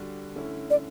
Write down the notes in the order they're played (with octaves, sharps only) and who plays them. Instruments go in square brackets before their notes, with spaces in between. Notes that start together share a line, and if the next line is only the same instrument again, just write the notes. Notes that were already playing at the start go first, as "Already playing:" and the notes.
Already playing: [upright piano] D3 G3 D4 F#4
D3 A3 C#4 E4
[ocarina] D5